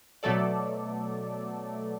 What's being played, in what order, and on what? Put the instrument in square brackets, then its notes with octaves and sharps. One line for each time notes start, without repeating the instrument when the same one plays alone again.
[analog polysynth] B2 F#3 A3 A4 D5